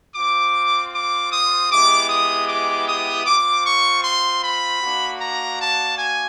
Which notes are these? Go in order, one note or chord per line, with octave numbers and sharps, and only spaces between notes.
C4 F4 D6
D6
D#6
G#3 B3 E4 G4 D6
D#6
D6
D#6
C4 F4 D6
C#6
C6
B5
A#3 D4 F#4
A#5
A5
G#5